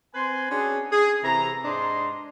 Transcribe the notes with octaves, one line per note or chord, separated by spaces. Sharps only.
C4 B4 G#5 C6
C#4 D4 F#4 G#4
G#4
C3 E3 A4 A#5
G#2 D4 D#5 C6